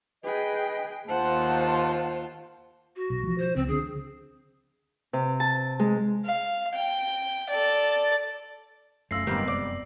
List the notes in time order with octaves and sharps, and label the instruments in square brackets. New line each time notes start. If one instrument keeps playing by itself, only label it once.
[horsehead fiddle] G#4 G5 [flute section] B4 D#5
[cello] D#2 F4 [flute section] C5 A5 [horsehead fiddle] F#5
[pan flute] F#4
[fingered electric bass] B1
F3 F#3
[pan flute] C5
[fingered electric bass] C#2 [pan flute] C4
[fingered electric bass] D3 [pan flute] G#4
[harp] C3
A5
G#3
[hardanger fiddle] F5
G5
A4 D5
[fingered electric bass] F1 F#2 [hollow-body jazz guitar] A3 C#4 F4 [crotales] E6 A#6 C7
[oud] G#2 D#3 G3 [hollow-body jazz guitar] C3 B3
[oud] D5